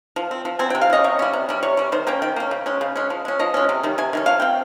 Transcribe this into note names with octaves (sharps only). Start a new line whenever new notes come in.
F3
C4
F3
C4 G#5
C3 G5
F5
G3 C#4 D#5
C3 C#5
G3 C#4
C3
G3 C#4
C3 C#5
G3 C#4
D#3 C5
A#3 C#4 G5
D#3 G5
A#3 C#4
C#3
G#3 C#4
C#3
G#3 C#4
F3
G#3 C#4
F3 D#5
G#3 C#4
C3
D#3 G3
C3 G#5
D#3 G3 C#4
F3 F5
C4 G5